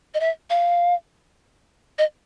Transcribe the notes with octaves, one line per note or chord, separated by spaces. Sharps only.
D#5
E5
F5
D#5